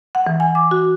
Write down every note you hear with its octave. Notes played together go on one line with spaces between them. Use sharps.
F#5
E3
G#5
D6
F#4